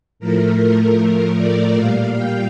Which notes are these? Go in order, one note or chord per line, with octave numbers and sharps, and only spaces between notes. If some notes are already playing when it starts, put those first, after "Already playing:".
A2 F3 A3 A#4
A#4
D5
A#2 G3 F5
G5